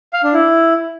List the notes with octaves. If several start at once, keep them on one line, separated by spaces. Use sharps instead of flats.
F5
D4
E4